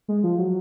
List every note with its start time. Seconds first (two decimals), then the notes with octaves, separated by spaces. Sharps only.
0.08 G#3
0.23 F3
0.38 F#3